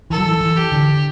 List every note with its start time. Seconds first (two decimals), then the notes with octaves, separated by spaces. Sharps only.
0.10 E3 A4
0.18 F#3
0.26 E3
0.41 E3
0.56 G4
0.72 D3